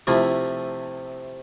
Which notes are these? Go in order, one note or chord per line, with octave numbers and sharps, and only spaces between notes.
C3 F3 A3 E4